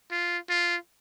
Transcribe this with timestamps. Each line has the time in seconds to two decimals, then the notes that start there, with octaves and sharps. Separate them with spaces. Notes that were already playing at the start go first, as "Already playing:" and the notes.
0.11 F4
0.49 F4